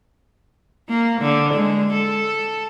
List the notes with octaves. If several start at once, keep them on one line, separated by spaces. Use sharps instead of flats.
A#3
D3
G#3
A4